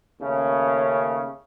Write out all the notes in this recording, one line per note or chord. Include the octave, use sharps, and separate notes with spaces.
D#2 C#3 A3 C#4